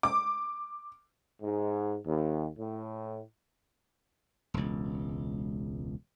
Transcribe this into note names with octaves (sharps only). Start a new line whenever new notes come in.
D6
G#2
D#2
A2
E1 C#2